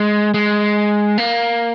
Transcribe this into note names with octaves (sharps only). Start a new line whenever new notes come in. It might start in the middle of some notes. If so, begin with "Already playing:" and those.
Already playing: G#3
G#3
A#3